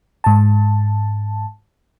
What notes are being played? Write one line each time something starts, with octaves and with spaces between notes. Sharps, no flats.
G#2 A5